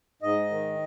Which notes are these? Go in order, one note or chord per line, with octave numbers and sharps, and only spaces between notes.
G#2 D#5
D#3